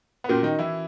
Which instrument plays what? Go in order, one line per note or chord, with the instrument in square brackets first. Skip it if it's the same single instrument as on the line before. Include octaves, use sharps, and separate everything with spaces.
[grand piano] B3
[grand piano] A#2 A#3 [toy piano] C#4 F#4 A#4
[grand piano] D#3 D#4
E3 E4